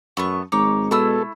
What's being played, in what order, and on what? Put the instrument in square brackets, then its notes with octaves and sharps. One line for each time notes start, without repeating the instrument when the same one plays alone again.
[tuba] F#2 [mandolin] A3 B3 C#6
[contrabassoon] G#1 [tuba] G#3 [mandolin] D#4 C#5 D6
[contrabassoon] B2 [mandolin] A3 E4 E6 [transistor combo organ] A4